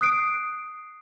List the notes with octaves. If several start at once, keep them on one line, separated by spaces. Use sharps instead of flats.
D#6 F#6 C7 D7